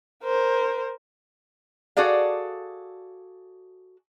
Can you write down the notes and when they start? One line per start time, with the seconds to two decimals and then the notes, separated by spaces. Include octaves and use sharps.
0.24 A#4 C5
1.97 F#4 G#4 A4 D5 F5